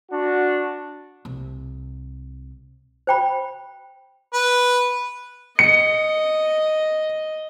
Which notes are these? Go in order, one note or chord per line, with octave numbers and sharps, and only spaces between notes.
D4 F#4
C2
C5 G5 B5
B4
D#5 C#7